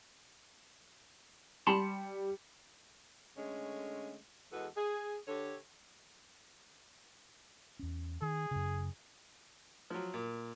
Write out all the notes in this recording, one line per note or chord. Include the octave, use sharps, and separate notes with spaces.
G3 A5 B5 C6 C#7
D3 G#3 A3 C#4
E2 G#3 F#4 A4 B4
G#4
D3 G4 A4 C#5
E2 C#4
D#3 G#4
F#2 C#3
F3 F#3
A#2